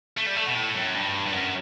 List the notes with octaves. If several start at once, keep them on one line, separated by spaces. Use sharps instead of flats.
A3
G3
A3
B2
A2
F#2
G2
G2
F#2